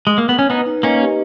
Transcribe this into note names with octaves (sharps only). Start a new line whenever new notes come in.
G#3
A#3
B3
C#4
B3 D#4 B4
D#4
A#3 C#4 D#5
G4